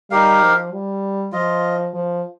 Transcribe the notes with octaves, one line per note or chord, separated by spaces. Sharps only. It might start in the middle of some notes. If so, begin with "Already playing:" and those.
G3 D#4 G4 A#4 F5
F3
G3
F3 F4 D#5
F3